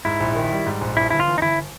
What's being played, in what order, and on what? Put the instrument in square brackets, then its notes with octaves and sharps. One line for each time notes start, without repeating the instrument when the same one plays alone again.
[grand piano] G#2 [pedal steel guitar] E4
[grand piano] A#1
D#3
G3
G#2
A#1
[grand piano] G2 [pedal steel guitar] E4
[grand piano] G1 [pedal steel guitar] E4
[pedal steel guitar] F4
[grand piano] E3
[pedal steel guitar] D#4
[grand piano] G1 [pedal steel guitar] E4